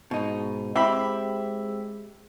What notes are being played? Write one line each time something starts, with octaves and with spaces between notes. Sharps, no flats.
G#2 B2 D#4
G#3 C4 E4 G4 E5 B5